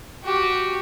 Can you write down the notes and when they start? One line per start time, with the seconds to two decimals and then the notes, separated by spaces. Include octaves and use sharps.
0.24 F#4 G4